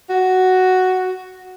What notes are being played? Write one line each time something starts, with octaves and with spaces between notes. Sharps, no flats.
F#4